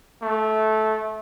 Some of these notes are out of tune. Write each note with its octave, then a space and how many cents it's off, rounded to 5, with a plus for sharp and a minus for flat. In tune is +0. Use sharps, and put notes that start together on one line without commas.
A3 -15